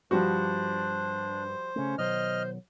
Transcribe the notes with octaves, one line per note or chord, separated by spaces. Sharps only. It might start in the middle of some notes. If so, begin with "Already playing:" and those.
G2 F3 G3 D4 F#4 C5
C#3 A3 C#4
B2 D#3 F#3 C5 D#5 F6